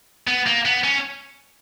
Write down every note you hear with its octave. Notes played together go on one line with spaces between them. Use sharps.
B3
A#3
B3
C#4